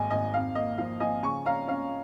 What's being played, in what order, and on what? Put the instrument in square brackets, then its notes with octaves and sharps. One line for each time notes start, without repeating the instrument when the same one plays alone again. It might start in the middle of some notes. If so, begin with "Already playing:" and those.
Already playing: [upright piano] G#1 G#2 G#3 D#5 G#5
G#1 D#5 G#5
F2 F5
A#3 D#5
F3 F5
F3 D#5 G#5
C#3 G#5 C#6
C#4 F5 A#5
C#4 F5